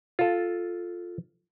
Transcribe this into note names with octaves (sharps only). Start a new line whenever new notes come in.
F4 A4